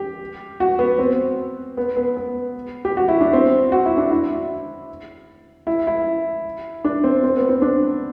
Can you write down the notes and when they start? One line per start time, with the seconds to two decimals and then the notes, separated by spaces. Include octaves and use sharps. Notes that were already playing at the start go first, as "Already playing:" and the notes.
Already playing: G4
0.60 F#4
0.79 B3
0.98 C4
1.77 B3
1.97 B3
2.16 B3
2.85 G4
2.97 F#4
3.08 E4
3.21 D4
3.33 C4
3.72 F#4
3.85 E4
3.97 D4
4.11 E4
5.67 E4
5.87 E4
6.85 D4
7.04 C4
7.24 C4
7.37 B3
7.49 C4
7.62 D4